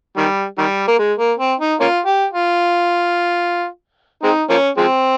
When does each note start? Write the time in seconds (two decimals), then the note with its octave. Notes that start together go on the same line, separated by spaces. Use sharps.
0.17 D#3 G3
0.58 D#3 G3
0.88 A#3
0.99 G#3
1.18 A#3
1.39 C4
1.60 D#4
1.80 A#3 C#4 F4
2.06 G4
2.33 F4
4.23 G#3 C4 D#4
4.50 F3 A#3 C#4
4.77 F3 G#3 C4